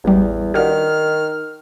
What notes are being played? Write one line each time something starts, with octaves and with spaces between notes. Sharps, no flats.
A1 E2 G3
D#3 D4 F#4 G4 F6